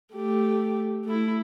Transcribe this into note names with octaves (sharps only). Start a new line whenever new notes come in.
A3 G4
A3 E4